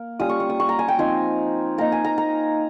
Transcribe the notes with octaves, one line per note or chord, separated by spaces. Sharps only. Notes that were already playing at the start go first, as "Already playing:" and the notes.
Already playing: A#3
G3 C#4 F4 D#6
C#6
C#6
D#6
C#6
A#5
G#5
G5
F3 C4 D#4 G#5
A#3 D#4 A#5
G#5
A#5
A#5